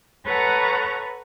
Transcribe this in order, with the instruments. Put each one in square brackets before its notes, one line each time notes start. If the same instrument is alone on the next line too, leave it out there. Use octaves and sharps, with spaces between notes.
[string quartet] A4 B4 C#5 F#5 A#5 C#6